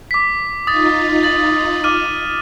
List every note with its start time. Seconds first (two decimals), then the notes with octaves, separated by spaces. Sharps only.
0.11 D6 B6
0.67 D#4 F4 D#6 A6
1.23 A6 F#7
1.84 D6 F6 D#7